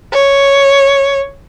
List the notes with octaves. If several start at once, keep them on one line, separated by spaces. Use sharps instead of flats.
C#5